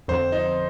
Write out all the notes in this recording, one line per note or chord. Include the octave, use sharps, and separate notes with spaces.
F2 D3 F3 C4 C5
D#4